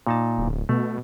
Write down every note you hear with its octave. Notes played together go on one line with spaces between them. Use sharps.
A#2 D#4 A5
D1
B2 A3